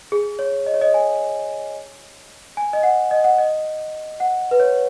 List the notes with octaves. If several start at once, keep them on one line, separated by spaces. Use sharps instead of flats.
G#4
C#5
D#5
C#5
D#5
G#5
G#5
D#5
F#5
D#5
F#5
D#5
F#5
B4
C#5